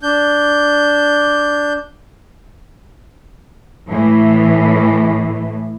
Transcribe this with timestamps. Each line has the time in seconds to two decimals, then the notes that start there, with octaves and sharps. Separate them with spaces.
0.03 D4 G6
3.89 A2 E3